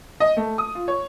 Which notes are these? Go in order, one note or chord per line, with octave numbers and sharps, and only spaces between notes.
D#5
A3
D#6
F4
C#5